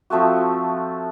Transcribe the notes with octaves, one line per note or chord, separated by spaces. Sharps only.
F3 A3 C4 F#4